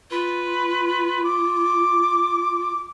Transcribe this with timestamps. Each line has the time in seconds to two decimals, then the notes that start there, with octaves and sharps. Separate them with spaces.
0.11 F4 B4
1.24 D6